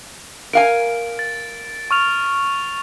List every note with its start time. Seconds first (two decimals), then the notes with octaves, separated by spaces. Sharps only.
0.53 A#4 F5 G#5 D7
1.19 A6
1.91 C#6 F6 F7